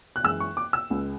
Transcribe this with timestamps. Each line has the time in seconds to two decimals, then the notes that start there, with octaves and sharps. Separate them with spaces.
0.16 F#6
0.24 F#2 E3 G#3 E6
0.40 C#6
0.57 D6
0.73 E6
0.90 C#2 C#3 G#3